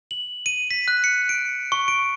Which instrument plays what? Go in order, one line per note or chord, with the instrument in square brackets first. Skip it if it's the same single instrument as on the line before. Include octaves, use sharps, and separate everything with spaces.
[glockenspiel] F#7
D#7
B6
F#6
C#7
D7
C#6
D7